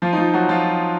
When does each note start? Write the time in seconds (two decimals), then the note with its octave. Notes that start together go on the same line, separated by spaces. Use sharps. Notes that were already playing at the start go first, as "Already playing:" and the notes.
0.02 F3 F4
0.13 D#4
0.17 F3 F4
0.33 F#3 F#4
0.49 F3 F4